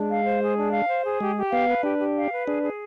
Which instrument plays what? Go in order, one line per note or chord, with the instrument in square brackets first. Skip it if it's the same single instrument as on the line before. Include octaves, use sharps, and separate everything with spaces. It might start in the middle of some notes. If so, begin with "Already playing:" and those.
Already playing: [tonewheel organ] G#3 [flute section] D4
[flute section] F5
C5
G#4
D4
F5
C5
G#4
[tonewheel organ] G#3 [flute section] G4
[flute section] G4
[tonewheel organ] B3 [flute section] F5
[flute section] B4
[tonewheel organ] D4 [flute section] G4
[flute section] G4
F5
B4
[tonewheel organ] D4 [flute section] G#4
[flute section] G#4